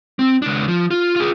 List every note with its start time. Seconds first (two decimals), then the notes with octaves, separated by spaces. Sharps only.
0.19 C4
0.42 C#2 D4
0.68 F3
0.91 F4
1.16 F4 G#4